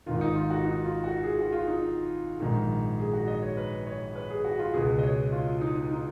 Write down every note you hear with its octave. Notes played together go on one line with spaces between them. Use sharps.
G#1 G#2 D#3 F4
D#4
F4
F#4
D#4
F4
F#4
G#4
F#4
F4
D#4
A#1 G#2 D#3
G#4
F#4
D#5
C#5
B4
C#5
B4
G#4
F#4
F4
C#2 B2 G#4
D#5
C#5
F4
D#4
D#4